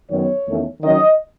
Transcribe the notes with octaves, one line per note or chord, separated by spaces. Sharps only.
F#2 D#3 F#3 B3 C#5
E2 D#3 A3 C#4
D#3 F#3 C#4 D#5